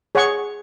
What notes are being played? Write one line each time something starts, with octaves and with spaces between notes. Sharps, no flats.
G#4 C#5 F#5 C#6